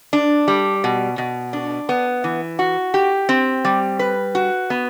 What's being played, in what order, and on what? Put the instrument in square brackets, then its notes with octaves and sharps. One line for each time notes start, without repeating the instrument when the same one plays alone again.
[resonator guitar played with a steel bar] D4
G3
B2
B2
D4
B3
E3
F#4
G4
C4
G3
B4
F#4
B3